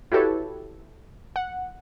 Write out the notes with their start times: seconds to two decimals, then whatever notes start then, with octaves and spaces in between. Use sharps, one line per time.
0.12 E4 F#4 G4 A4 B4 C#5
1.36 F#5